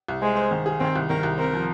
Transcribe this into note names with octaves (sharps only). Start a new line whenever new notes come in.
C2
G#3 C5
C5
D#3
G#4
D#3 C4
C2
D#3 A#4
C2
C4 A#4
F3